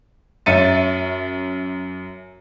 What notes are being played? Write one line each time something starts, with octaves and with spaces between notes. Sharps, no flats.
F#2 C#4 E5 A6 C#7 D#7